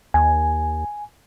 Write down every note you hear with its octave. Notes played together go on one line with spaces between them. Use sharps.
D#2 G#5